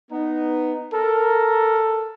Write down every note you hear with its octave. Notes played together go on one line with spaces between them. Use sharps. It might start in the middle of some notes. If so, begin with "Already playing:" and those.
B3 D#4
A4 A#4